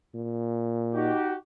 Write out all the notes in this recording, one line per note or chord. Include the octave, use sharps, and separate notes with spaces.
A#2
D#4 F#4 G4